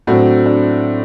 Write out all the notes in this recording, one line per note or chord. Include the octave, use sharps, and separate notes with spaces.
A2 F#3 C4 D4 F#4
D4